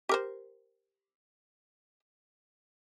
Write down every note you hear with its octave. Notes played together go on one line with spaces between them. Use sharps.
G4 A#4 C5